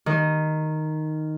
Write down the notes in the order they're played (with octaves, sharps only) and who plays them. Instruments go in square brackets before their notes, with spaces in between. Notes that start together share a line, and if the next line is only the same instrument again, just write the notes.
[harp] D#3